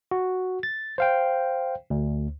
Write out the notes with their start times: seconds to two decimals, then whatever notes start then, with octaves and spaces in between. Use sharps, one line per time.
0.11 F#4
0.63 A6
0.98 C5 F5 G5
1.90 D2